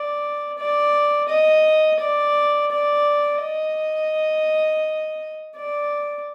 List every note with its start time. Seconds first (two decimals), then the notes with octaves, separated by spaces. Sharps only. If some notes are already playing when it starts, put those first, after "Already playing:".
Already playing: D5
0.58 D5
1.29 D#5
2.01 D5
2.71 D5
3.42 D#5
5.56 D5